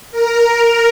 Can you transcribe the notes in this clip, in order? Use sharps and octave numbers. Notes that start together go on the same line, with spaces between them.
A#4